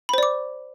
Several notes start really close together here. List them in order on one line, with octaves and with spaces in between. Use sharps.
B5 C5 D5 D6